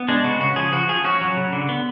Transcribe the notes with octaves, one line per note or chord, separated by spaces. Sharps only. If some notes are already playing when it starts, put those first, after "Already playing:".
Already playing: B3
G#3 D4
C#3 F#4
C#3 F#4
F3 G#4
F3 F#4
F3 G#4
C#4 F#4
F#3
C#3
D3
B3